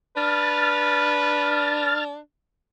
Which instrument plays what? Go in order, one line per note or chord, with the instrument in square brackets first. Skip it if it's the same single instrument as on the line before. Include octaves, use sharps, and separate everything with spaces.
[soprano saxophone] D4 [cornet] B4 [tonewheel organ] F6 A6